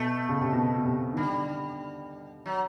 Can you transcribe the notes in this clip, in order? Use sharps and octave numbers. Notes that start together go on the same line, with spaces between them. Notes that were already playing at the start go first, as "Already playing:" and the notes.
Already playing: B2 A3
C#3
C3
B2
B2
C3
D#3
D3 G3
F#3